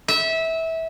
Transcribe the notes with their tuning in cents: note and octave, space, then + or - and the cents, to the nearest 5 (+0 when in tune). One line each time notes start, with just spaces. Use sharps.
E5 -20